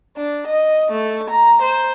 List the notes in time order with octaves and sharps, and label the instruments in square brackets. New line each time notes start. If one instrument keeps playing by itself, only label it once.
[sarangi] D4
D#5
A3
A#5
C5